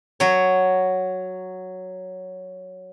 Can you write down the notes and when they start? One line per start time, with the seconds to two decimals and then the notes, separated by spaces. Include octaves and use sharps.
0.20 F#3 C#5